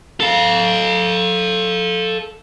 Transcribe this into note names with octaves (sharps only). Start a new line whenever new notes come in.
A4 F5